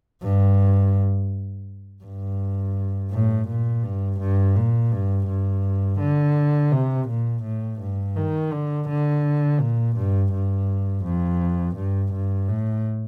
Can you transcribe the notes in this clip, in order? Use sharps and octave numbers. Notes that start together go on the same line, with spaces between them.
G2
G2
A2
A#2
G2
G2
A#2
G2
G2
D3
C3
A#2
A2
G2
D#3
D3
D3
A#2
G2
G2
F2
G2
G2
A2